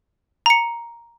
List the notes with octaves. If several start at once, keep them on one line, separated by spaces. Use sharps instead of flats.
A#5 C#7